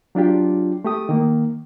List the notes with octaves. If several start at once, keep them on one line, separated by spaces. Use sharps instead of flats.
F#3 D4 F4 G4
A3 G4 D#6
D#3 A#3